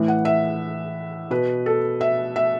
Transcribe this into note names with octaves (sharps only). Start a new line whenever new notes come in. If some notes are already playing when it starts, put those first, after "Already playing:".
Already playing: A2 E3
F#5
E5
B2 B4
A4
E5
E5